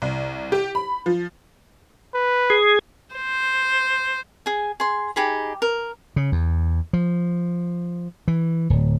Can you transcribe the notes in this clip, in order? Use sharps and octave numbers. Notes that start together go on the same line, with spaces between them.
C2
G4
B5
F3
B4
G#4
C5
G#4 G#5
G#4 C6
D#4 G4 G#4 B5
A#4
C#3
E2
F3
E3
D1